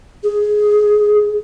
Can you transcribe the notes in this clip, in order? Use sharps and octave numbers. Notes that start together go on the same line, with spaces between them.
G#4